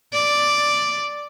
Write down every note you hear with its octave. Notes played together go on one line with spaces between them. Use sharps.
D5